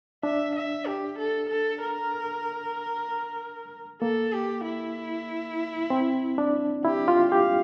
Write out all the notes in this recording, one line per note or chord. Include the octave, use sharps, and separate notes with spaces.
D4 E5
E5
G4
A4
A4
A#4
A#3 A4
G4
E4
C4
D4
E4 G4
F4
G4 F5